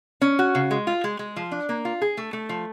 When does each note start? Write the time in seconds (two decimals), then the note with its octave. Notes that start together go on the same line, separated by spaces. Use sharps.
0.22 C#4
0.39 F#4
0.55 C#3
0.71 G#3
0.87 F4
1.04 G#3
1.19 G#3
1.36 F3
1.52 D4
1.69 A#3
1.85 F4
2.02 G#4
2.17 A3
2.33 A3
2.49 F3